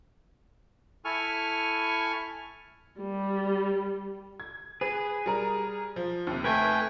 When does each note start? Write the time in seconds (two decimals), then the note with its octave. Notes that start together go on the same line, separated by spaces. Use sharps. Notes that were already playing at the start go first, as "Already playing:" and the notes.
1.05 E4 A4 G#5 C#6 F6
3.01 G3
4.40 G#6
4.81 G#4 B4
5.26 G3 A#4 A#5
5.96 F3
6.27 D#2 C3
6.44 A3 B4 G5 G#5